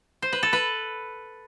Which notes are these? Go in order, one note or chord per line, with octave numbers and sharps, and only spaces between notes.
C5
B4
A4
B4